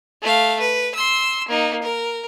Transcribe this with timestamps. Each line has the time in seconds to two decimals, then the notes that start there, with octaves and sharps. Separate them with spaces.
0.22 A3 F5
0.60 B4
0.95 C6 E6
1.48 A#3 D#4
1.82 A#4